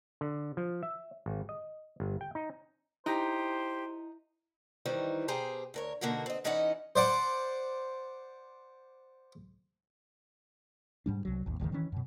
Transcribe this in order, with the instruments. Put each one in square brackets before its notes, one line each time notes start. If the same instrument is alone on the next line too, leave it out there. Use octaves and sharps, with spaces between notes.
[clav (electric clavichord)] D3
F3
E5
G#1
D#5
G1
G5
D#4
[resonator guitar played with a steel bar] D#4 [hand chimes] E4 [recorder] G4 [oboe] C5
[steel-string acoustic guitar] D#3 E3 G3 D#4 C5
B2 G4 G#4 C5 A#5
D2 A#4 C#5
B2 D3 A#3 D#4 F#4 A#4
C4 D#5
E3 C#4 D#4 E4 D#5 F#5
[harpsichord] C5 D5 F#5
[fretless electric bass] G#2 G3 D4
C2 F#3
G#1 D#2
F1 D2 G#2 D#3
D#3 E3 C#4
F#2 B2